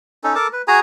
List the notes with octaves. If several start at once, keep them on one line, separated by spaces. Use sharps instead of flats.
C#4 D#4 A4
A4 A#4 A5 D6
B4
F#4 G#4 G#5 A#5